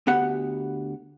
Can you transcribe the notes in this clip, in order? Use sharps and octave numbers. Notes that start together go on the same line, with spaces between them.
D2 B3 G4 F#5